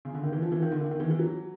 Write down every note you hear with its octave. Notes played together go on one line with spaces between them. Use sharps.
C#3
D3
D#3
E3
F3
E3
D#3
D3
D#3
D#3
E3
E3
F#3